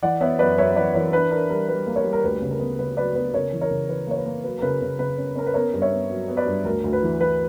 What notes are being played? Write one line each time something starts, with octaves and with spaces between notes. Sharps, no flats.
E3 D5 F#5
B3 C#5 E5
F#2 B4 D5
F#2 C#5 E5
E3 B4 D5
E3 A#4 C#5
D4 B4
D4 A#4
G3 A#4
G3 B4
A#3
A#4 C#5
G3
A#4
D2 B4
C#3
A#4
B3
C#3 B4
F#3 B4 D5
B3 B4
C#3 A#4 C#5
E3
A#4 C#5
C#3
E3 B4
A#3 C#5
B4
A#3
F#3 B4
A#4
C#3 B4
C#3
C#3 B4
C#4
C#4 A#4
B4
B3 A#4 C#5
G2
C#5 E5
B3
F#3
B3
B4 D5
G2
D2 A#4
D2
B4
E3
E3 B4